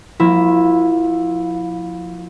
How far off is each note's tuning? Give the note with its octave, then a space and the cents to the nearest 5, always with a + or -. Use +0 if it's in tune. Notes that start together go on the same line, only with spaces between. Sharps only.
F3 +25 A#3 +0 E4 +0